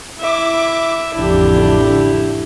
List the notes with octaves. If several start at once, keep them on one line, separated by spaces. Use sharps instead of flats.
E4 E5 D6
A1 F2 D3 D4 E4 G4